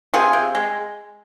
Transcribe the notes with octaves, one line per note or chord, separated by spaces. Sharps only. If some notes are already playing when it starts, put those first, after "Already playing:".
C3 F4 G#4
C3
G#3